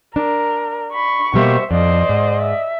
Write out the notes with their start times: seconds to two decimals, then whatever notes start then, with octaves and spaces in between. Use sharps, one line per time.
0.16 D4 A#4
0.93 B5 C#6
1.34 B2 G3 A#3 C5 E5
1.71 F2 C5 D5 D#5
2.09 G#2
2.42 E5